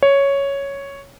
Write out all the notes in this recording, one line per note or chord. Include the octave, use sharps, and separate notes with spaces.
C#5